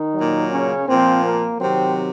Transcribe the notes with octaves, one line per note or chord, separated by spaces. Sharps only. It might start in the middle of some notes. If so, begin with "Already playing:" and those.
Already playing: D#3 D#4
A#2 F#3
C#3 C#4
A#2 F3 C4
A#3
C3 D#3 F#3 C4